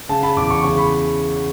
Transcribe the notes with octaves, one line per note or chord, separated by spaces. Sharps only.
C#3 A5
B5
E2 D6
C#6
C#3 C#6
B5